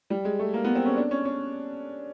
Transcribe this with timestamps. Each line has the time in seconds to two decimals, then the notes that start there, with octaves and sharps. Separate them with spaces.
0.10 G3
0.25 G#3
0.39 A3
0.54 A#3
0.64 B3
0.75 C4
0.86 C#4
0.96 D4
1.11 C#4
1.25 C#4